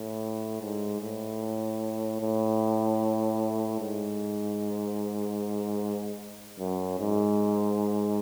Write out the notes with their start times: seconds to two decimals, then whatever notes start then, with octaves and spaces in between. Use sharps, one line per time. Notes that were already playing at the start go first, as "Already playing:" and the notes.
Already playing: A2
0.61 G#2
1.01 A2
2.21 A2
3.80 G#2
6.59 F#2
6.99 G#2